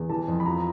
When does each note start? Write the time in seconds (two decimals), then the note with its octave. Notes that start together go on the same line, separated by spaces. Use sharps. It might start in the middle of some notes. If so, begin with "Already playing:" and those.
Already playing: E2
0.10 E3 A5
0.28 F2
0.40 B5
0.45 F3 A#5